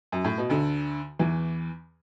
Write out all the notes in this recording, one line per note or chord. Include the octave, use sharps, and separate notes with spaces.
F#2
A2
B2
D2 D3
E2 E3